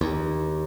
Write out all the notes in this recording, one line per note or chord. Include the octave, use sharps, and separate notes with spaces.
D#2